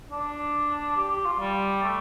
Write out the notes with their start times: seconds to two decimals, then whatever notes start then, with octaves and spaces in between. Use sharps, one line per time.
0.11 D4
0.97 G4
1.11 G4
1.25 F4
1.39 G3
1.83 A3